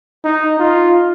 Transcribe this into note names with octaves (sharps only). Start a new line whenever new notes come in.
D#4
F4